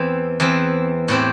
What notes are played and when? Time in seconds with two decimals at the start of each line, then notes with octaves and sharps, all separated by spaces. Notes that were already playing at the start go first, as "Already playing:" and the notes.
Already playing: E2 E3 C4
0.40 E2 E3 C4
1.08 A2 E3 C4 G4